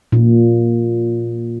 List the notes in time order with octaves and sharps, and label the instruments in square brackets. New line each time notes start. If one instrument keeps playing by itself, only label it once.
[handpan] A#2